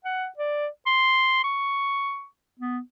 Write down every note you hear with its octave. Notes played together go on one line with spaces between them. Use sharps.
F#5
D5
C6
C#6
B3